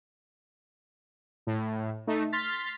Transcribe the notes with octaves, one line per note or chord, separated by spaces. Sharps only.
A2
A3 D#4
C6 F6 A6 B6